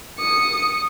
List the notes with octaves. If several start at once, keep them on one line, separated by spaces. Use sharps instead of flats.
D#6 C#7